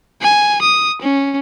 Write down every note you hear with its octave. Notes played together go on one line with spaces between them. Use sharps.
G#5
D#6
C#4